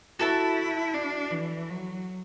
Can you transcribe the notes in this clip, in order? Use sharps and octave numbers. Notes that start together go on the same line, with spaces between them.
E4 F#4 A4 E5 A5
D4
E3
F#3